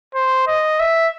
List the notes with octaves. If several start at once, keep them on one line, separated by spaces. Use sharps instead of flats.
C5
D#5
E5